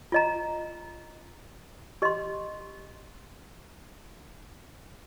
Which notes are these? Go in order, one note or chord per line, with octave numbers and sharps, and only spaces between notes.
F4 D#5 A#5
G4 D#5 C6